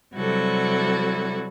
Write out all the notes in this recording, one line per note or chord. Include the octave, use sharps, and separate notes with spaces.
C3 F#3 G3 E4 F#4 A4